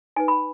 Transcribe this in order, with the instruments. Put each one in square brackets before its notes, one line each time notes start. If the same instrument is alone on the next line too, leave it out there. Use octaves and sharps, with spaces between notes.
[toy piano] D#4 B4 G#5
B5